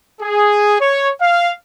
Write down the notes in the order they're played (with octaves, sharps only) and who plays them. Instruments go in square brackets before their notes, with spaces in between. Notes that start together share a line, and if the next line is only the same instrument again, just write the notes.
[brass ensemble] G#4
C#5
F5